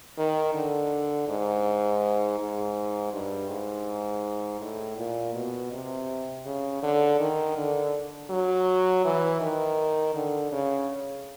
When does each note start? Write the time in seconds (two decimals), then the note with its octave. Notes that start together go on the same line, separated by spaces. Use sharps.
0.18 D#3
0.54 D3
1.28 G#2
2.39 G#2
3.12 G2
3.50 G#2
4.61 A2
4.98 A#2
5.35 B2
5.72 C3
6.46 C#3
6.83 D3
7.20 D#3
7.56 D3
8.30 F#3
9.04 E3
9.40 D#3
10.15 D3
10.52 C#3